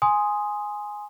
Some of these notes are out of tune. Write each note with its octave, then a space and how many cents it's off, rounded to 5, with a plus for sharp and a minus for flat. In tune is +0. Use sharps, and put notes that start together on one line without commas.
G#5 +0 C6 +0 D#6 +0